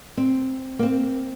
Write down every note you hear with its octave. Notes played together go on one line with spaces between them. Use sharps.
C4
A#3
C4